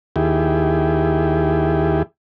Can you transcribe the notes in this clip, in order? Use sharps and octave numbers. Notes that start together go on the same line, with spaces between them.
D#2 E4 G4 G#4